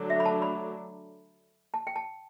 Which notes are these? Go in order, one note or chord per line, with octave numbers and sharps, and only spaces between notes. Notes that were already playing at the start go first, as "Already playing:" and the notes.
Already playing: D3 F#3 A3 D4
E5
B5
A5
B5
A5
G5
A5